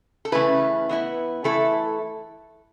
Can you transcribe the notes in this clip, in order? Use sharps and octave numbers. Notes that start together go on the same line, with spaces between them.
A4
C#3 E3 A3 C#4 E4 B4
E3 B3 E4
E3 A3 E4 A4